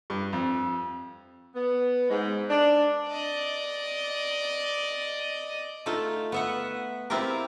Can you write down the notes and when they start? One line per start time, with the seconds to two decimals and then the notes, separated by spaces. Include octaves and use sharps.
0.10 G2
0.33 F2
1.55 B3
2.10 G#2
2.50 D4
3.07 D5 D#5
5.86 A3 D#4 F4 A4
6.32 B3 E5 F#5
7.10 C4 E4 F4 G4 A#4